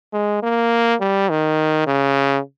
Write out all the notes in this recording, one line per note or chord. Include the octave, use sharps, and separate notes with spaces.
G#3
A#3
G3
D#3
C#3